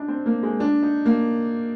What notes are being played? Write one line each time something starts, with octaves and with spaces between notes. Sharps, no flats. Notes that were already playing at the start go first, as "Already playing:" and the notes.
Already playing: D4 D#4
C4
A#3
G#3
D4
D#4
A#3